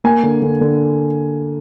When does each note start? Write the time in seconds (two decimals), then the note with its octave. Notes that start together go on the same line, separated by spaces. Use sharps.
0.04 A#3 G#5
0.23 D3
0.42 D3
0.61 D3